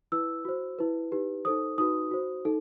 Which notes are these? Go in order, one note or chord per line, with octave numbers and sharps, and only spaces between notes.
E4 B4 E6
F#4 C5
E4 B4
D#4 G4 B4
D#4 A4 C5 D#6
D#4 F#4 B4 D#6
F#4 C5
D#4 A4